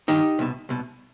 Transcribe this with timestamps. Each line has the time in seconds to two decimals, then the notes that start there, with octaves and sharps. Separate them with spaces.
0.08 G2 D#3 D#4 G4
0.39 C2 B2
0.69 C2 B2